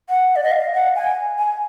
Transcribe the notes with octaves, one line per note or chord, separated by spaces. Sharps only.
F#5
D5
D#5
F5
F#5
G#5
G#5